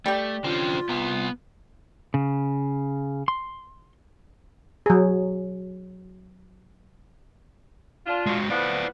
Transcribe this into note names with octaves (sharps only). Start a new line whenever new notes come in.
G3 A3 G4
D3 F3 C4 C#4 F4
C2 B3
C#3
C6
F#3 G#4
D4 F4
G#3 F#4
A2 F3 B3 E4 D5